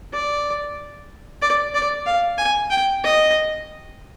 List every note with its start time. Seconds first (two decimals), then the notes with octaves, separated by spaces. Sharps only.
0.13 D5
1.42 D5
1.74 D5
2.06 F5
2.38 G#5
2.70 G5
3.04 D#5